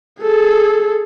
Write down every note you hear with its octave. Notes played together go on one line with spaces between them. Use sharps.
G#4 A4